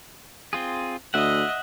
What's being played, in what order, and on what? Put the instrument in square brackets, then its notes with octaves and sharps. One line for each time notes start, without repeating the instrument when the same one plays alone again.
[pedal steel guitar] C4 F4 G#4
[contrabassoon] D2 [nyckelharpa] D#5 [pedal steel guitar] E5 F#5